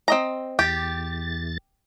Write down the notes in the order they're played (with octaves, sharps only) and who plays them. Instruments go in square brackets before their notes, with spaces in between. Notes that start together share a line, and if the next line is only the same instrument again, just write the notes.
[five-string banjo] C4 D#5 A#5
[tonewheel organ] E2 A6 [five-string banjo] G4